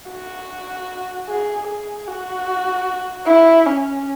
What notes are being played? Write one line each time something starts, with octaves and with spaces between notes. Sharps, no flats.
F#4
G#4
G#4
F#4
E4
C#4